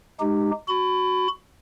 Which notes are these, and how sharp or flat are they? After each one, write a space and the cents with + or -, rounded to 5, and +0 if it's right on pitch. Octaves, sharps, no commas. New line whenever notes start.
G#3 +0 D#4 -30 G4 +0
F#4 +0 B5 +25